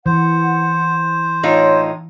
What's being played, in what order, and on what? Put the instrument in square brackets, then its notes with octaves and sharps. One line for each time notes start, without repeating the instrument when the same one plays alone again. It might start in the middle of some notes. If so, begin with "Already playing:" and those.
[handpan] E3 [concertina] C5 [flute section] F#5
[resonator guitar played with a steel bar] A2 D#4 F4 [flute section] C#5